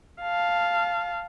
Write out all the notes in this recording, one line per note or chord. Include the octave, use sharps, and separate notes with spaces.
F5 A5